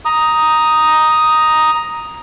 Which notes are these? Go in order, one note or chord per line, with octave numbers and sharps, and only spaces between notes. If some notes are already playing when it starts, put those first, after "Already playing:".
A#5 D#6